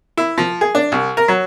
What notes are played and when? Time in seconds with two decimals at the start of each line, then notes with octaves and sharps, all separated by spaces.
0.17 E4
0.38 F3
0.61 G#4
0.75 D4
0.92 C2
1.17 A#4
1.28 F#3